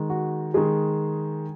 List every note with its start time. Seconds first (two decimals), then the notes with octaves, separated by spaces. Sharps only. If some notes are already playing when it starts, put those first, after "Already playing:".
Already playing: D#3 G#3
0.10 F#4
0.54 D#3 G#3 G#4